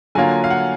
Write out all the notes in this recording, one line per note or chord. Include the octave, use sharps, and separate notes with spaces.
D3 F#3 A#3 F4 G#5
F5
F#5